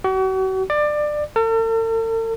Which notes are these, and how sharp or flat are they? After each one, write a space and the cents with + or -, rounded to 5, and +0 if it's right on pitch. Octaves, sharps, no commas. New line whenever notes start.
F#4 +40
D5 +20
A4 +45